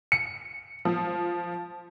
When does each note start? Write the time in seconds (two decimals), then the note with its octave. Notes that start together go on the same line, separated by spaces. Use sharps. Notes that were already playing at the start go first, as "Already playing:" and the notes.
0.12 C#7
0.85 F3